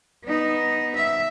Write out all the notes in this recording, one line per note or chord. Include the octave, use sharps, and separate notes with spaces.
B3 D#4
E5